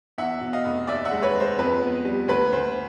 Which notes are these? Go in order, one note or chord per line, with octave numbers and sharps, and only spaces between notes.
E2 E5 F#5
B2
D#5 F5
F1
D#2 D5 E5
E5 F#5
G#3
B4 C#5
G#3
C5
F2 B4
B3
G3
D2 B4
D2 C5